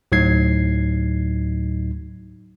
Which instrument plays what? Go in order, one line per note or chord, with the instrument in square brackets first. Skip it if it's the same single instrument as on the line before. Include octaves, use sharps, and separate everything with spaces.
[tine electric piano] D2 A2 F#3 D#4 G#6 C7